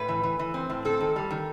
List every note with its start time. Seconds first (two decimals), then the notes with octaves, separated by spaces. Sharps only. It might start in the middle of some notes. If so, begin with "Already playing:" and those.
Already playing: A2 B4
0.08 E3
0.23 E3
0.39 E3
0.54 C4
0.70 A2
0.85 C4 A4
1.00 D#3
1.16 G3
1.31 D#3